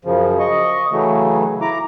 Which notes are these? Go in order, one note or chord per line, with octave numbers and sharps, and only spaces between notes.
F#2 C#3 F3
D#5 C#6
C#3 E3 F#3 A3
E4 A#5 D6